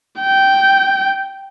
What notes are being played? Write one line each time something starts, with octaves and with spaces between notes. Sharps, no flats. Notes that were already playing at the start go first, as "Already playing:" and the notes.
G5